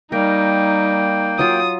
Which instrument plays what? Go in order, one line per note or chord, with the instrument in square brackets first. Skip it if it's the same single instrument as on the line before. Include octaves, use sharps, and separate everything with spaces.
[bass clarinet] G3 [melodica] A#3 G5 [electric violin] D#4 [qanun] A#4
[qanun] F#3 F4 [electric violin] D#6